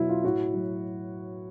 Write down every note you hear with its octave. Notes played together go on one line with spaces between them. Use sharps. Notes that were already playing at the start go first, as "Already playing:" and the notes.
Already playing: B2 F#3 E4
F4
A2 E4 F#4
F#3